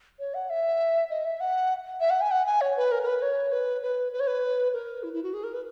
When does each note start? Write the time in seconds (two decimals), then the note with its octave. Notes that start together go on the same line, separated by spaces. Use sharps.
0.19 C#5
0.34 F#5
0.50 E5
1.10 D#5
1.25 E5
1.40 F#5
2.00 E5
2.10 F#5
2.21 G#5
2.31 F#5
2.46 G#5
2.61 C#5
2.76 B4
2.91 A#4
3.03 A#4
3.06 B4
3.22 C#5
3.52 B4
3.82 B4
4.12 B4
4.20 C#5
4.27 B4
4.73 A#4
5.03 E4
5.13 E4
5.23 F#4
5.34 G#4
5.43 A#4
5.53 B4